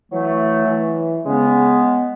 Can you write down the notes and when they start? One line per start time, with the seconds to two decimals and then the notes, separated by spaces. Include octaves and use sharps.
0.12 E3 F#3 A3
0.68 E3
1.25 C#3 G#3 B3